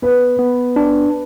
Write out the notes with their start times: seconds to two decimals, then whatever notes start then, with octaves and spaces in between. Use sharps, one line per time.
0.02 B3 B4
0.39 B3
0.76 D4